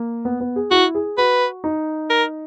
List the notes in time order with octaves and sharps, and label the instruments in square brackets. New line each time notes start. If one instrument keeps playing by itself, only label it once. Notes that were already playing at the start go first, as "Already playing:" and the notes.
Already playing: [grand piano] A#3
B3
B3
G#4
[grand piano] E4 [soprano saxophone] F#4
[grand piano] G#4
[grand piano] F#4 [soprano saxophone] B4
[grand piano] D#4
[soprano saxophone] A#4